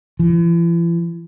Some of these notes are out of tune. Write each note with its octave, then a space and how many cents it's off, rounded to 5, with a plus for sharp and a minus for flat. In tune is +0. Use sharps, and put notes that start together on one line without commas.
E3 +45